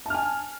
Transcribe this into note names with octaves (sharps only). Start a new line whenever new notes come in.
G#5 A5 F6